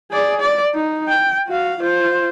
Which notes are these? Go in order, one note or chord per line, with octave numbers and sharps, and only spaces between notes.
G#4 D5
D5
D#4
G5
F#4 F5
F4 C5